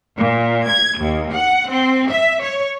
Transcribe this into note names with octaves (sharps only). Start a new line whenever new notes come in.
A#2
G#6
D#2
F#5
C4
E5
C#5